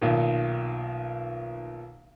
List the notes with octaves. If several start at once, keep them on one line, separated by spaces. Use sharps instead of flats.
B1 A#2 D#3